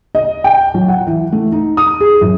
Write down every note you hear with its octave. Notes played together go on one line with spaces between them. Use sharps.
D#5
G5
F#3
F#5
E3
A3
D#4
D#6
G#4
F#2